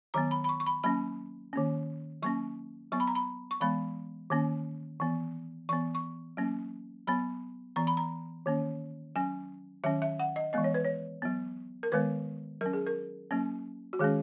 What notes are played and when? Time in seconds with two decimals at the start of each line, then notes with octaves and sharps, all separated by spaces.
0.14 D#3 F#3 B3 A#5
0.31 B5
0.44 B5
0.49 C#6
0.60 C#6
0.66 B5
0.84 F#3 A#3 C#4 B5
1.53 D#3 A#3 C#4
2.22 F#3 A#3 C#4 C#6
2.92 F#3 B3 C#6
3.00 B5
3.07 A#5
3.15 B5
3.51 C#6
3.61 E3 G#3 B3 B5
4.30 D#3 A#3 C#4
5.00 E3 B3
5.69 E3 B3 C#6
5.95 C#6
6.37 F#3 A#3 C#4
7.07 F#3 B3 B5
7.76 E3 B3 A#5
7.87 B5
7.97 A#5
8.46 D#3 A#3 C#4
9.16 F#3 C#4 G#5
9.84 D#3 F#3 C#4 E5
10.02 E5
10.19 F#5
10.36 D#5
10.53 E3 G#3 B3 D#5
10.64 C#5
10.74 B4
10.85 C#5
11.22 F#3 B3
11.83 A#4
11.92 D#3 G#3 B3 B4
12.61 F#3 C#4 A#4
12.73 G#4
12.86 A#4
13.31 F#3 A#3 C#4
13.93 F#4
13.99 D#3 G#3 C#4 G#4